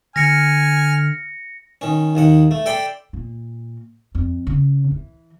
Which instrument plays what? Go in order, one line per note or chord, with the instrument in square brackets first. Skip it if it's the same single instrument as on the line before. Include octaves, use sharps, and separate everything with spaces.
[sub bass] D3 [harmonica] G#5 F6 [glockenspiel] A#6 C#7
[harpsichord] D#3 C#4
D#2 D#3 F#5
A3
A4 D5 G5 B5 C6
[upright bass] A#2
F2
C#3
E3